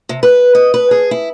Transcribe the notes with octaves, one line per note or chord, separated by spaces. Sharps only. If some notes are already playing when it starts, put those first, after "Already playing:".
C3
B4
D#5
B4
G#4
E4